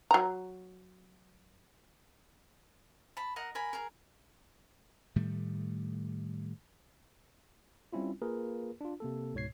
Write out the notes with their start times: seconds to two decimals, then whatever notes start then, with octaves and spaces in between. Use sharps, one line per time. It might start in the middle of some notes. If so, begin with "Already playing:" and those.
0.11 F#3 A#5
3.17 A5 B5
3.36 A#4 D#5 F#5
3.55 A#4 G#5 B5
3.73 G#4 A#4
5.16 A2 D#3 G3 A3
7.93 G3 C4 C#4 E4 F4
8.22 A#3 F4 G#4 A#4 B4
8.81 D4 F4
9.00 C3 A#3 A4
9.34 C#2 G#2 B2 C#5 G#6 C7